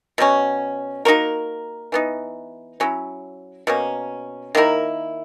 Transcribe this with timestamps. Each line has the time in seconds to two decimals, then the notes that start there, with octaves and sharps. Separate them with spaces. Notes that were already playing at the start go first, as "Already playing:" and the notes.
0.18 B2 F#3 C#4
1.05 A#3 D#4 F#4 A#4
1.92 E3 B3 D#4
2.80 F#3 C#4 E4
3.67 B2 A#3 C#4
4.55 D#3 A#3 E4 A#4